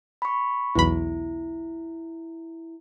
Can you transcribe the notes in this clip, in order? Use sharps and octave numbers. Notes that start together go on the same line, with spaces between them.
B5 C#6
B1 E2 E4 B5